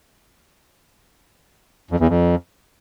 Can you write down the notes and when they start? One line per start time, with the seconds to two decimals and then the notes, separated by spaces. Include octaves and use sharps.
1.91 F2
2.00 E2
2.09 F2